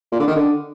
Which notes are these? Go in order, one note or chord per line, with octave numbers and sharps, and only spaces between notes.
A#2
D3
D#3
D3